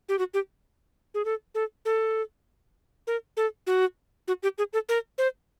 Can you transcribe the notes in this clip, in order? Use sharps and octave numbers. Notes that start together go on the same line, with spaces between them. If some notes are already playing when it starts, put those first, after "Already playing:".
G4
F#4
G4
G#4
A4
A4
A4
A#4
A4
F#4
F#4
G4
G#4
A4
A#4
C5